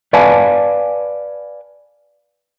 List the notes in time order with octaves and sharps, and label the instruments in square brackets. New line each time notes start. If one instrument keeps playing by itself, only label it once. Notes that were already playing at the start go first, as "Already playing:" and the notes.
[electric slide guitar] B4 D5 F5 G#5 A5